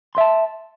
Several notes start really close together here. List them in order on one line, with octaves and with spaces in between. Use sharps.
C6 E5 A5